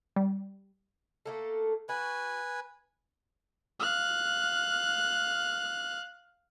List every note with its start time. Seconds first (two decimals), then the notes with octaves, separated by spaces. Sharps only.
0.16 G3
1.26 A3 A#3 A4
1.89 F#4 B4 G#5
3.80 F5 F#6